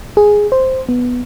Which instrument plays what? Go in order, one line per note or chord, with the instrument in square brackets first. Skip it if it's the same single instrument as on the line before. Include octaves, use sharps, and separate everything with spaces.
[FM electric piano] G#4
C5
B3